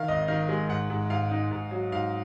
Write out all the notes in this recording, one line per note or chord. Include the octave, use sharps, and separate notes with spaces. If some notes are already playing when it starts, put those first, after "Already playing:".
Already playing: D#3 F5
G#1 D#5
D#3 F5
G#3
G#2 F#5
G#2
G#2 F5
D#4
G#2
F#3
G#2 F5